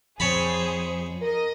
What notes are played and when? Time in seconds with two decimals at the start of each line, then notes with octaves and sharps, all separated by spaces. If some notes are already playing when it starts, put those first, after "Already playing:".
0.20 F2 G#4 C5 C#5 A5 B5
1.22 A#4 D#5